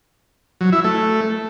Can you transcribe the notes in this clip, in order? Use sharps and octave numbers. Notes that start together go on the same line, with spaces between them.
F#3
E4
A3